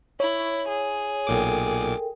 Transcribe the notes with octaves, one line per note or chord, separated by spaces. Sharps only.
E4 C#5
G#4
B1 A#2 A4 A#4 G5 D6